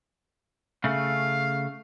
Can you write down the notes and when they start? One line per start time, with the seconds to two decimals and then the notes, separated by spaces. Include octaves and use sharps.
0.84 C#3 A3 F5